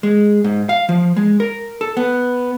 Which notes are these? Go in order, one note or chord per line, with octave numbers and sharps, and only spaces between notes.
G#3
G#2
F5
F3
G#3
A#4
A4
B3